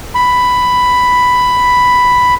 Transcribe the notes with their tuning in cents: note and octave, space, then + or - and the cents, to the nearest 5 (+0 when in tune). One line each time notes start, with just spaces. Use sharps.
B5 +5